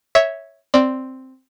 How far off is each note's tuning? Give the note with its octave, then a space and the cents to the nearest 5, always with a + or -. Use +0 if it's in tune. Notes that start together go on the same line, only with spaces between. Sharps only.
C#5 +0 E5 -10
C4 +0 D5 +0